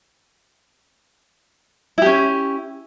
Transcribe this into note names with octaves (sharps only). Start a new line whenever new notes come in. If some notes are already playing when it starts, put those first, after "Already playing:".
C#4 E4 G4